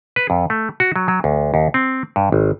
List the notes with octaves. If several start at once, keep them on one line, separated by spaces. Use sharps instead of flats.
B4
F2
A3
F#4
F#3
F#3
D2
D#2
C4
G2
G#1